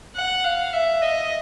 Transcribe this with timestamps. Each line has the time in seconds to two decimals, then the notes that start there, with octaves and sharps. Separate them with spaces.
0.16 F#5
0.44 F5
0.73 E5
1.02 D#5